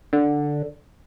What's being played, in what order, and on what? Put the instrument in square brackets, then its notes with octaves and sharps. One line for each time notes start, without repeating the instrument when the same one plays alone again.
[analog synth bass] D3